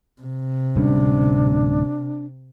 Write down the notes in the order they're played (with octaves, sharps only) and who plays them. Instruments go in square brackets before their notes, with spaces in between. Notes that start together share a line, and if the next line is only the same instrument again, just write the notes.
[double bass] C3
[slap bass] D1 G3 C#4 [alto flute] D4